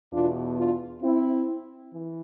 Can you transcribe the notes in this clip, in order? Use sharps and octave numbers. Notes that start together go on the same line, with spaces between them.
E2 B2 D4 F4
D4 F4
C4 E4
E3